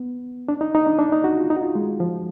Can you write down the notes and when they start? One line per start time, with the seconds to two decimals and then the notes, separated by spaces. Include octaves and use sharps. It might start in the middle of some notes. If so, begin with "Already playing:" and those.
Already playing: B3
0.48 D4
0.61 D#4
0.75 D#4
0.87 D4
0.99 D4
1.12 D#4
1.24 F#4
1.38 F4
1.50 D#4
1.57 F#4
1.62 F4
1.75 G#3
2.00 F3